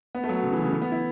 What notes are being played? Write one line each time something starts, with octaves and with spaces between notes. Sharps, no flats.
B3
A3
F#3
C#3
E3
C#3
E3
B3
E4